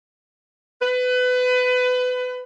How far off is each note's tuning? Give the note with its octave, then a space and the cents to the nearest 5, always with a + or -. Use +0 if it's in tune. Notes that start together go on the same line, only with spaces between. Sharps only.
B4 +25